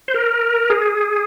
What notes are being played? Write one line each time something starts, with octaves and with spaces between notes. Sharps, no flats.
C5
A#4
G#4